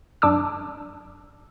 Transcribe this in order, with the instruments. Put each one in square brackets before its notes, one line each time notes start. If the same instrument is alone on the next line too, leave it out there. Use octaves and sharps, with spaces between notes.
[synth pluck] F#2 D4 D6 E6